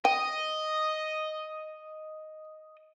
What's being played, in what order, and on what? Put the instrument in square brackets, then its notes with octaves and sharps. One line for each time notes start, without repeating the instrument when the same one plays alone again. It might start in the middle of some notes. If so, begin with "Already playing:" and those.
[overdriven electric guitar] D#5 [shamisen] G5